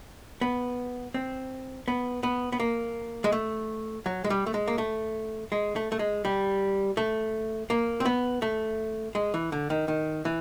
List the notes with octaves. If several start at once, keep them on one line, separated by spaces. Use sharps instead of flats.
B3
C4
B3
B3
B3
A#3
G#3
A3
F#3
G#3
G3
A3
G#3
A#3
A3
G#3
A3
A3
G#3
G3
A3
A#3
C4
B3
A3
G#3
E3
D3
D#3
D#3
E3